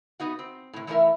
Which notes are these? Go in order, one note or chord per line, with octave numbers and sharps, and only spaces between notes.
B3 D#4 F#4
C4
A2 C3
E3 A3 D4 E4 A#4 E5